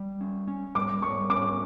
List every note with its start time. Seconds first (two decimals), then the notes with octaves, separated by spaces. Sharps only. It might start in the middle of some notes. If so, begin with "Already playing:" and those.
Already playing: G3
0.21 C#4
0.48 C#4
0.75 G3 D6
1.02 G3 C#6
1.30 C#4 D6